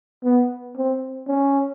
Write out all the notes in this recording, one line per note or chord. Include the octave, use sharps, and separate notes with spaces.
B3
C4
C#4